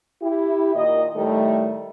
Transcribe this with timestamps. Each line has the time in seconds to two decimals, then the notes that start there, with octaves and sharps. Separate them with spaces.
0.22 E4 G4
0.74 A#2 D#3 D#5
1.16 A2 D#3 G3 A3